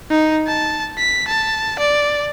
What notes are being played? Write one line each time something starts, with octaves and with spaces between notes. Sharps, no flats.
D#4
A5
B6
A5
D5